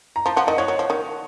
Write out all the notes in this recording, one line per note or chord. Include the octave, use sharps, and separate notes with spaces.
A#5
F3 A5
F3 F#5
D#3 D#5
F3 C#5
F#3
F3
D#3